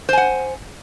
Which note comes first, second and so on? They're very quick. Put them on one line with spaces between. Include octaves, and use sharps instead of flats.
C5 G#5 F#5